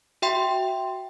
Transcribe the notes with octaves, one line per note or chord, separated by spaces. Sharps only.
F#4 E5 G5 C6